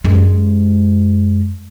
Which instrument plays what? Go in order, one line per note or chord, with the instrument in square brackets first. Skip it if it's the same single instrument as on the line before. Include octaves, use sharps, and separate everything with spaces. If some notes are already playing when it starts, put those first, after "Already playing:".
[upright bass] F#2 G#3